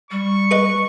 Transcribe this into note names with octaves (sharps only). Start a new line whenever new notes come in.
G3 C#6
G#4 B4 D#5